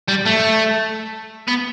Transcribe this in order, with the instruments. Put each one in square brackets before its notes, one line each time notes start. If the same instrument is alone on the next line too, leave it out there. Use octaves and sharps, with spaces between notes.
[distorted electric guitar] G3
A3
B3